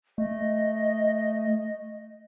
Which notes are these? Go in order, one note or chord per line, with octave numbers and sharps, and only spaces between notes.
A3 D#5